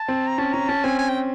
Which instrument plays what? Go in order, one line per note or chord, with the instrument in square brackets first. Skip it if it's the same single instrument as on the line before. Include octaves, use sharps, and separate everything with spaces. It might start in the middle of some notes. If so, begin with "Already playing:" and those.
Already playing: [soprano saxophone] A5
[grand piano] C4
[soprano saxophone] A#5
[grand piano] C#4 [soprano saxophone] A5
[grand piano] C#4 [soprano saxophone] A#5
[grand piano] C#4 [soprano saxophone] A5
[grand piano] C4 [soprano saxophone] G#5
[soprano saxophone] G#5
G5